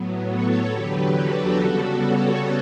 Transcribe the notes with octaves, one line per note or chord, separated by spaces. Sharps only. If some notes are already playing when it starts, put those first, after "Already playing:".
Already playing: A2 F#3 B3
A4 C#5
E2 D3 F#3 G4 B4
F#4 A4
C#3 G3 B3
A4 C#5